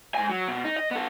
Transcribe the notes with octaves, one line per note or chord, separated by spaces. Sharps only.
G#2 G#5
F#3
B2
D#4
D#5
B3 A4